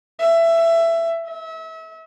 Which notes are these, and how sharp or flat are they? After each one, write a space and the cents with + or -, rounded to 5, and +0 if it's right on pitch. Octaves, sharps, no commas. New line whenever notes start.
E5 +15
E5 -35